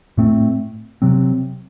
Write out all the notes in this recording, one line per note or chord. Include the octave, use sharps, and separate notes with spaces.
A2 A3 C4
C3 F#3 C4